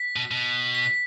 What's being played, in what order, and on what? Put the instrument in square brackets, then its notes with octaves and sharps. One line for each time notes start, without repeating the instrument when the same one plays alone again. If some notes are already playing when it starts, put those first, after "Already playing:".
Already playing: [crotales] B6
[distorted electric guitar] B2
B2
[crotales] B6
B6